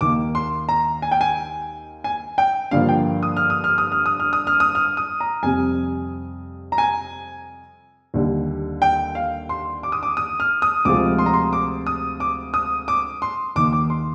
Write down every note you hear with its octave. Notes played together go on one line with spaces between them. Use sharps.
D#2 D#3 A#3 D6
C6
A#5
G#5
G5
G#5
G#5
G5
G2 D3 F3 A#3 F5
G5
D#6
F6
D#6
F6
D#6
F6
D#6
F6
D#6
F6
D#6
F6
D#6
A#5
F2 C3 G3 C4 G#5
A#5
G#5
D#2 D3 G3
G5
F5
C6
D6
D#6
D6
D#6
F6
D#6
D2 C3 F3 G#3 D6
C6
A#5
C6
D6
D#6
D6
D#6
D6
C6
D#2 D#3 A#3 D6
D6
C6